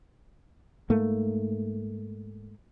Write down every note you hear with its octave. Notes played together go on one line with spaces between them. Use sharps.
G#2 A3 A#3